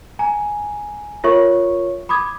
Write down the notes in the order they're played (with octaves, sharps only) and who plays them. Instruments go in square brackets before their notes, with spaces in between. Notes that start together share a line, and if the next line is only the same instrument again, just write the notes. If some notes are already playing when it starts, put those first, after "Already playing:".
[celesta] G#5 A#5
F4 A#4 C#5 E5 C#6
B5 D6 D#6 G#6